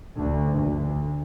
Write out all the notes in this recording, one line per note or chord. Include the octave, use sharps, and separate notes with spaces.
D2
D2